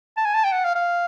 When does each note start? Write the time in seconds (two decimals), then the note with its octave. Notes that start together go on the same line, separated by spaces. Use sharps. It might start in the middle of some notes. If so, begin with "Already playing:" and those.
0.17 A5
0.26 G#5
0.35 A5
0.44 G5
0.52 F#5
0.65 F5
0.75 F5